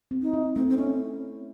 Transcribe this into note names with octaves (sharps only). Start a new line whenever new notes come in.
C4
D#4
E4
A3 C4
C4
C#4 E4